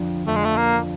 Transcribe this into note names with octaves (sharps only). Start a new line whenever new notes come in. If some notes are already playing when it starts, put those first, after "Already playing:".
Already playing: F2 D3 F3
F2 D3 F3 A3
G#3
A3
A#3